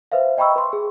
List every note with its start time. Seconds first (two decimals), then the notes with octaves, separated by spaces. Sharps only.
0.12 B4 C5 E5 F5
0.37 D#5 G5 A#5 B5 C#6 E6
0.56 B4 C6
0.73 G#4